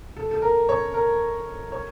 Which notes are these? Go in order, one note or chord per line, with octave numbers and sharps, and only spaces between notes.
A4
A4
A#4
C#5
A#4
C#5